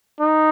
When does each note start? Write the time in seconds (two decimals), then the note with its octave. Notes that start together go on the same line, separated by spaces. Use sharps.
0.20 D#4